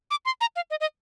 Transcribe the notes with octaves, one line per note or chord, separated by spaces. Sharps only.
D6
C6
A#5
F5
D#5
D#5